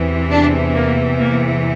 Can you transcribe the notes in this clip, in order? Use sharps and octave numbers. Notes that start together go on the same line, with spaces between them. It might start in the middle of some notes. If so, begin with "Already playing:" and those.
Already playing: E2 C3 E3
D4
A#3
A#3